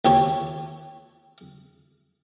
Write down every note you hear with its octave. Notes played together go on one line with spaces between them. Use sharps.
D#2 G4 C#5 A5